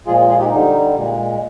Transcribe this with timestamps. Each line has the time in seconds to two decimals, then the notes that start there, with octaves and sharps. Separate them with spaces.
0.07 A#2 F3 G#3 F4 G#4
0.29 F4 G#4
0.40 D#4 G4
0.51 D3 G3 D#4
0.95 A#2 G#3